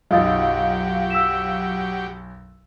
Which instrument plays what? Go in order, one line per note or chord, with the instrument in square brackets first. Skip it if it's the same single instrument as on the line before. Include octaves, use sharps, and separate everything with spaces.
[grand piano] B1 F#2 [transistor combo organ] F#3 G4 [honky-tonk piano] F4 [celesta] D#5 D#6 A6
[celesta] E6 B6 E7